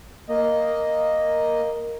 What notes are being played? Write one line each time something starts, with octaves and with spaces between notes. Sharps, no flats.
A#3 D#5